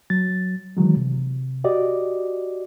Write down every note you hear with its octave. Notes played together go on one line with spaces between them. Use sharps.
F#3 A6
D#3 E3 F#3 G#3
C3
F#4 G4 D5 D#5